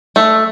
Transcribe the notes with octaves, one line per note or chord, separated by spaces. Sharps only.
A3